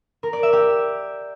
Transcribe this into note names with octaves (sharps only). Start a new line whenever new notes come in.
A#4
D5
E5
G4